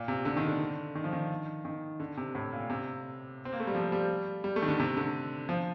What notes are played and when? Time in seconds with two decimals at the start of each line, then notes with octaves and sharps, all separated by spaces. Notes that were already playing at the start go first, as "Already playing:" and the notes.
Already playing: A#2
0.08 C3
0.25 D3
0.37 D#3
0.48 D3
0.95 D#3
1.04 F3
1.13 D#3
1.65 D#3
2.00 D3
2.17 C3
2.35 A2
2.52 A#2
2.70 C3
3.45 C4
3.53 A#3
3.60 A3
3.67 G3
3.75 F3
3.92 G3
4.44 G3
4.56 A3
4.62 D#3
4.68 D3
4.79 C3
4.97 D3
5.49 F3